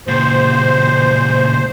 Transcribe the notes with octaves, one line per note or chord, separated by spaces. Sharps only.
C#2 A#2 C5